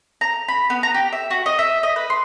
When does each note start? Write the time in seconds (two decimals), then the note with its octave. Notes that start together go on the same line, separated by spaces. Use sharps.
0.21 A#5
0.48 B5
0.70 B3
0.83 A#5
0.94 G4
1.12 E5
1.30 F#4
1.46 D#5
1.59 E5
1.83 D#5
1.96 B4
2.10 C6